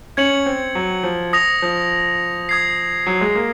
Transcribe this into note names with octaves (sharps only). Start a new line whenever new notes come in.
C#4 G#6 C#7 F#7
C4
F#3
F3
D#6 A#6 F7
F3
D#6 G#6 C7
F#3
G#3
A#3